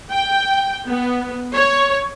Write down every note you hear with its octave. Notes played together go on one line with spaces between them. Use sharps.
G5
B3
C#5